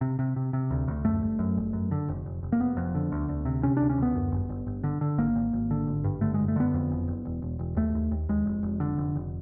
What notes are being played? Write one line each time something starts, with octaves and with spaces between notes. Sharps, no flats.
C3
C3
C3
C3
D2
D2
F#2 A3
G1
F#2
G1
F#2
D3
F1
F1
F1
A#3
F1 B3
F2
D3
D2
D2
C3
C3 C#4
D2 D4
C#4
D2 B3
F#2
G1
G1
G1
D3
D3
G#1 A#3
G#1
G#1
D3
G#1
G2
D3 A3
G#3
F#1
A3
D3 B3
F2
F#1
F#1
E1
E1
E1
D#2 A3
D#2
D#2
D#2 G#3
F1
F1
D3
F1
F1